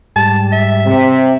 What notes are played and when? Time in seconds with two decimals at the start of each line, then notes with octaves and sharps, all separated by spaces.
0.16 G#2 G3 A5
0.52 E5
0.87 C3